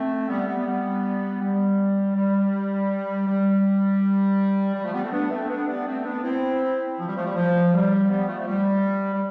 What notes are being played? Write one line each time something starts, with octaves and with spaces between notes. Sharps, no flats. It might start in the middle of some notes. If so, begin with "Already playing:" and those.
Already playing: A3 C4
G3 B3
G3 B3
G3 B3
G3
G3
G3
G3
F3 A3
G3 B3
A3 C4
B3 D4
A3 C4
B3 D4
G3 B3
D4
A3 C4
B3 D4
C4 E4
F3
G3
F3 A3
G3
F3
G3
G3 B3
F3 A3
A3
G3
G3